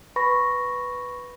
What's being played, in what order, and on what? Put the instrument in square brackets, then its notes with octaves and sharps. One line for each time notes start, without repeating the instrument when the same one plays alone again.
[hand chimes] B4 B5 C#6 A#6